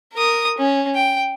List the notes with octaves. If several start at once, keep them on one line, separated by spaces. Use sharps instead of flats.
A#4 D#6
C#4
G5